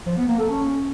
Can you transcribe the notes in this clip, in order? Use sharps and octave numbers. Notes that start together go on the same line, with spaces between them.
F3
B3
A#3
A4
C#4